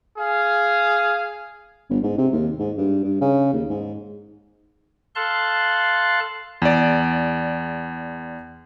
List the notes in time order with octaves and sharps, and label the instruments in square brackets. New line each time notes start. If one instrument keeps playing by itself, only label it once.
[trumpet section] G#4 F5
[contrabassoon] G1
G#2
C3
D#2
G#2
G2
G2
C#3
D#2
G#2
[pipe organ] A4 F5 A5 C6 F#6
[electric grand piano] E2 D5